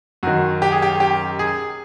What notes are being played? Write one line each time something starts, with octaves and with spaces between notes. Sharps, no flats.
F#2 D#3 F#4
G4
G#4
G4
G4
G#4